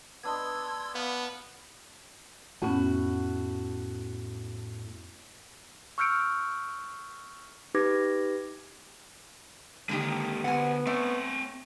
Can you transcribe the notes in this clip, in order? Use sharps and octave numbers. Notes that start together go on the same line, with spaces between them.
B3 D4 D#5 C6 E6 G#6
B3 F5 B5
F2 A2 B3 C#4 F#4
C#6 E6 F6 G6 C#7 D7
D#4 G4 B4 D6 G#6 A#6
D3 D#3 G#3 A#3 G4
D2 B3 F#5 G#5
A3 C4 C#5